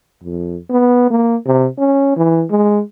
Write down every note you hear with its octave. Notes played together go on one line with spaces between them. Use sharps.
F2
B3
A#3
C3
C#4
E3
G#3